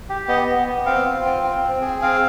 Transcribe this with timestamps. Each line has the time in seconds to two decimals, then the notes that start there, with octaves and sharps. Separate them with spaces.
0.09 G4
0.28 B3 D#5
0.47 B3
0.67 B3
0.85 C4 F5
1.05 F4
1.24 C4
1.43 C4
1.63 C4
1.81 G#4
2.02 C4 F5